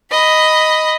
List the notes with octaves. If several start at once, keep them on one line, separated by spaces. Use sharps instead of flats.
D#5 B5